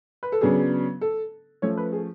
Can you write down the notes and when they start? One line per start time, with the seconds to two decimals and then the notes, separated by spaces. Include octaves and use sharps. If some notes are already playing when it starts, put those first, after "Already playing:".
0.23 B4
0.32 A4
0.41 C#3 F#3 B3 D4 G#4
1.01 A4
1.62 F3 A3 C#4 C#5
1.77 B4
1.93 G#4